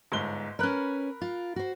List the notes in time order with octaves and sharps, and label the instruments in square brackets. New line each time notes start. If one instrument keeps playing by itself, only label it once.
[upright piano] G1 G#2 G7
[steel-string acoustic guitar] C#4 B4 [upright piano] A#4 B5 F#6
[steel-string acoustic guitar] F4
F#4 C5